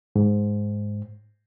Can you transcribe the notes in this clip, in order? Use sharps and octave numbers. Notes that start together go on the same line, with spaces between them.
G#2